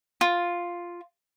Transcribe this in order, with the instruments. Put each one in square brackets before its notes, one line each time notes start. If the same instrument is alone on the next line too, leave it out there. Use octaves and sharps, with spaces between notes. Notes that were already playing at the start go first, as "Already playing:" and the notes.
[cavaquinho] F4